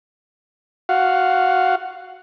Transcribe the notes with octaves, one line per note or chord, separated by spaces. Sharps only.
F#4 F5 F#5